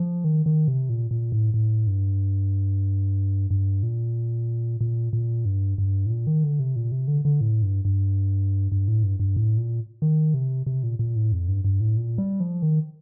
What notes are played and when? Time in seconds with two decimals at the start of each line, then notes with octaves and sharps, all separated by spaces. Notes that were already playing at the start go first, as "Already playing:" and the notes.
Already playing: F3
0.24 D#3
0.46 D#3
0.68 C3
0.89 A#2
1.11 A#2
1.32 A2
1.54 A2
1.87 G2
3.51 G2
3.83 A#2
4.81 A#2
5.13 A#2
5.45 G2
5.78 G2
6.06 A2
6.10 A#2
6.27 D#3
6.44 D3
6.59 C3
6.76 A#2
6.92 C3
7.08 D3
7.25 D3
7.41 A2
7.62 G2
7.85 G2
8.72 G2
8.88 A2
9.03 G2
9.20 G2
9.36 A2
9.57 A#2
10.02 D#3
10.34 C3
10.66 C3
10.83 A#2
10.99 A#2
11.16 A2
11.32 F2
11.48 G2
11.64 G2
11.80 A2
11.97 A#2
12.18 G3
12.40 F3
12.62 D#3